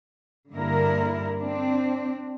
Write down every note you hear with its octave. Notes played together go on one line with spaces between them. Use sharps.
G2 D3 A#3 E4 A#4
C4 D4